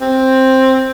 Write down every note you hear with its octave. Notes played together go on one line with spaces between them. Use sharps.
C4